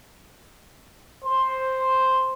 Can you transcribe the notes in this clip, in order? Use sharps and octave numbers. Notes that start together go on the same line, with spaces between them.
C5